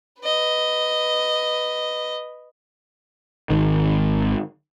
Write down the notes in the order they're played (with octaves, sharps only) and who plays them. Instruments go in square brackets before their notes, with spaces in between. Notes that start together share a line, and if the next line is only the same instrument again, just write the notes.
[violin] B4 D#5
[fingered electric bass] G#1 D#3